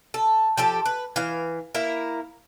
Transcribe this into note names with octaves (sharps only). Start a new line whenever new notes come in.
A4
F3 G4 A4
B4
E3 F5
A#3 E4 A#4